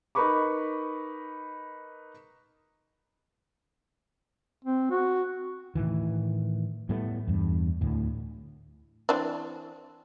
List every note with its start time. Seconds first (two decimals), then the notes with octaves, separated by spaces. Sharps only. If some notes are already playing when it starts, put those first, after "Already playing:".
0.15 D#4 A#4 B4 B5 C#6 D6
4.65 C4
4.91 F#4
5.75 A2 C3 D#3 E3
6.89 A2 G3 A3 B3
7.27 E2 G2
7.81 D2 A2
9.09 E3 C4 D4